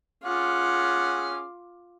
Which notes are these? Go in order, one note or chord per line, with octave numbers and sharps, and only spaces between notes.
C#4 F4 G#4 F#5 D6